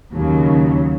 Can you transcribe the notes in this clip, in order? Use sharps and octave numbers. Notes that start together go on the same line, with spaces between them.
D#2 C#3 F#3